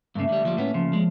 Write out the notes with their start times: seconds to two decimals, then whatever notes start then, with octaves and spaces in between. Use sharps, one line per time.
0.15 G2 C#3 A3 A#3
0.29 D3 G3
0.43 D2 F3 G3
0.57 A2 B3 C#4
0.74 C#3 F3
0.93 G#3